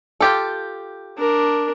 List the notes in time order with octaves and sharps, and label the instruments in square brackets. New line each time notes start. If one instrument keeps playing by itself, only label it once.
[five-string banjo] F4 G4 A4
[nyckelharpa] D4 A#4